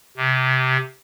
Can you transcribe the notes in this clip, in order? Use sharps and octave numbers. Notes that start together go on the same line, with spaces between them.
C3